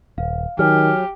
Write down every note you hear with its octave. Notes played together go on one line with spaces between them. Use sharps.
D#1 F5
D#3 F#3 G4 G#5 F6